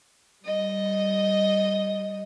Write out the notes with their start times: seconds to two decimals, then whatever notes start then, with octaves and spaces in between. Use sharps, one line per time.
0.44 G3 D#5